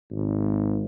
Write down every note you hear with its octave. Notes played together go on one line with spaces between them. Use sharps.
G#1